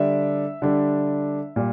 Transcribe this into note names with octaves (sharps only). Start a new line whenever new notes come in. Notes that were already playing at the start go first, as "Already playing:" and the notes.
Already playing: D3 G3 D4 E5
D3 G3 D4
A#2 G3